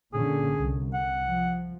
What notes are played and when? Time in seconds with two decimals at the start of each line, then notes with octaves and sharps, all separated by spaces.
0.14 A#2 D3 C#4 G#4
0.58 C2
0.94 F#5
1.27 F3